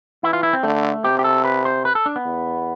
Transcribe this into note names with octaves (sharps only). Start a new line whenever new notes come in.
E3 E4
F4
E4
C4
D3 A3
C3 G4
G4
A4
B4
C5
B4
A4
D4
B3
E2